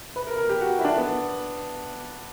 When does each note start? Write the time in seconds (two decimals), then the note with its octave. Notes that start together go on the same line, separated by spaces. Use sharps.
0.16 B4
0.27 A#4
0.38 A#4
0.49 G4
0.61 F#4
0.79 E4
0.84 D4
0.97 B3